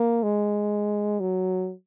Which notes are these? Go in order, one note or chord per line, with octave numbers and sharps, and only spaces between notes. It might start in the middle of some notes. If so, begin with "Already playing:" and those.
Already playing: A#3
G#3
F#3